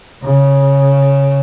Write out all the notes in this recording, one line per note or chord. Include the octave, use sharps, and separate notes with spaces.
C#3